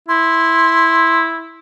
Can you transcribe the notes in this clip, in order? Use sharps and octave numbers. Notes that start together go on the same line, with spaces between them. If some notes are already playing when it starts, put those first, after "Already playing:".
E4 C6